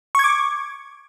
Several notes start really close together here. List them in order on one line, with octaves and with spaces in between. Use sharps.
C#6 G#6 D6